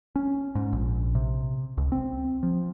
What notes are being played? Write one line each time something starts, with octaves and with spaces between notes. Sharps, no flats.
C#4
G#2
A#1
C3
C#2
C4
F3